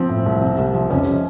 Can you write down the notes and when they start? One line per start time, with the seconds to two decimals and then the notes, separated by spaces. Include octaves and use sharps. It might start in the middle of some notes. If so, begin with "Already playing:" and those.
Already playing: F3 C4
0.09 A2
0.26 C2
0.42 C3
0.58 C2
0.74 F3
0.90 F1 C#4